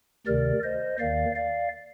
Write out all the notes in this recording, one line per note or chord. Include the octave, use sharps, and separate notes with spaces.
D2 C3 D#3 A#4 D5
C5 D#5
D#2 D#3 D5 F5
D5 F5